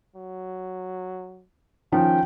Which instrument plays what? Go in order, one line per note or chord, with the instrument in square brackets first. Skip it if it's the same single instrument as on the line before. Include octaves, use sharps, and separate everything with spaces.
[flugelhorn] F#3
[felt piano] D#3 F3 C#4 [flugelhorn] G5